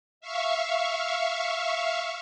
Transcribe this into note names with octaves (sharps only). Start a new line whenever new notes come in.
E5 F5 C#6